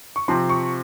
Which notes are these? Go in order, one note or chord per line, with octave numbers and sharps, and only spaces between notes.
C#6
C3 F3 C4 C6
C#6